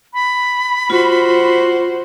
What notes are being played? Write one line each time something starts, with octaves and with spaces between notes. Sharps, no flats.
B5
F4 F#4 C5